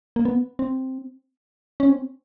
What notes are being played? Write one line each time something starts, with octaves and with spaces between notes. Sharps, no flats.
A#3
B3
C4
C#4
C4